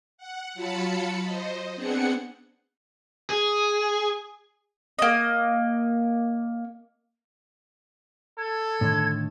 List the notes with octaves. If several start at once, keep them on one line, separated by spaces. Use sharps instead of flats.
F#5
F#3 F4 A5 B5 C#7
C5 D#5
B3 C4 D4 G#4 F#5 C#7
G#4
A#3 D#5
A4 G#6
A2 D3 D#3